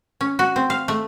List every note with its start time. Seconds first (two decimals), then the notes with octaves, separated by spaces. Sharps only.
0.21 C#4
0.39 F#4
0.56 C4
0.70 F5
0.88 A3